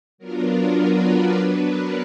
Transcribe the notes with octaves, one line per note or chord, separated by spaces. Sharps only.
F#3 B3 D4 F4 A#4
A#4
B4
D5
F#3 B3 D4 B4
A#4